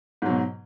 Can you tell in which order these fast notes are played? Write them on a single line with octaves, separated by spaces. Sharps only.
G#2 F#3 B2